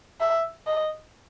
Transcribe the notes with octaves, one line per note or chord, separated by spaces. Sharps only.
E5
D#5